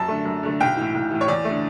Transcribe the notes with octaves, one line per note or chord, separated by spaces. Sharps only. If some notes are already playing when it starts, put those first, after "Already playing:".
Already playing: F#2 A5
D3 A3
F#2
D3 A3
B1 G5
A2 E3
B1
A2 E3
C#5
E2 D5
A3
D3